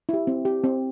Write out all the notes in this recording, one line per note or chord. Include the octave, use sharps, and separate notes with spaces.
E4 G4
C4
G4
C4